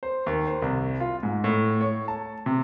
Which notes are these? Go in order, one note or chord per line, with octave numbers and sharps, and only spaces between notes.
C5
D#2
C5
C2
F4
G#2
A2
C#5
A5
C3